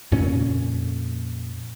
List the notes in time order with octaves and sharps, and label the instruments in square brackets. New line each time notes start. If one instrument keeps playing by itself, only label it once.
[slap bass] F2 A#2 C#3 C#4